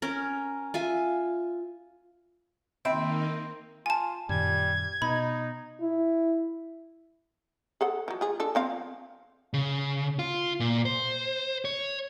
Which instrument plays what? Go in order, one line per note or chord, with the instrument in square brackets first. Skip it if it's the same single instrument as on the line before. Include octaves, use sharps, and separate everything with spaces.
[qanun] C#4 A#4
F4 E5 G#5
[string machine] D#3 A#3 D#4 [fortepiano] C4 [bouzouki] E5 [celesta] G5 B5 D7
[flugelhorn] F4 [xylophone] G#5 A5
[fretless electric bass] F#2 A#2 D#3 [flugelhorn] G3 [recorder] G#6
[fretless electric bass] B2 [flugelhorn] D#4 [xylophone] B5
[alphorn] E4
[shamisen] G#4 A4 F#5
F3 F#3
F4 G#4
D4 F4 A4
F3 C4 F5
[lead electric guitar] C#3
F4
A#2
C5
C#5